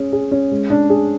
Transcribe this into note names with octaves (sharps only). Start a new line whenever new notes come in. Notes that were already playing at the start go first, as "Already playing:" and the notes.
Already playing: C#4 G#4
G#4
C#4
G#3
D4
G#4